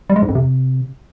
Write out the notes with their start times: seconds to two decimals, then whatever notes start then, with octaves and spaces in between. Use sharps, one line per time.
0.10 G3
0.16 G#3
0.22 G#2
0.29 F2
0.35 C3